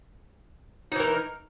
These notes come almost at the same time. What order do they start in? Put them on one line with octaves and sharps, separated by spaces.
D#4 E3 A#4